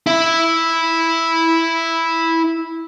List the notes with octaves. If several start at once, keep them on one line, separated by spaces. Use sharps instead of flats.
E4 E5